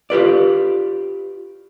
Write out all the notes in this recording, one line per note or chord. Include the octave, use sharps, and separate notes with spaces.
F4 G4 B4 D5